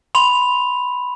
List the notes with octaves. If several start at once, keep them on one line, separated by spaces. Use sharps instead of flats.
B5 C6 F7